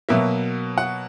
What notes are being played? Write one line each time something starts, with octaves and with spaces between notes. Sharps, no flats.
B2 F#3 A#3 E5
F#5